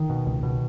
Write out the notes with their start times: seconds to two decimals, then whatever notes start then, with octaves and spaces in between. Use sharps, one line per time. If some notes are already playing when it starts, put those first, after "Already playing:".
Already playing: D#3
0.10 B2
0.26 C#2
0.43 B2